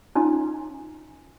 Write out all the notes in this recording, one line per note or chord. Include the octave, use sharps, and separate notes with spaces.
C#4 D#4 F4 G#5